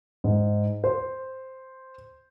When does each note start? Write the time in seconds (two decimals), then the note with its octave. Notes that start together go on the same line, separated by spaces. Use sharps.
0.24 G#2
0.84 C5